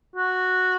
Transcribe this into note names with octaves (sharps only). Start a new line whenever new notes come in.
F#4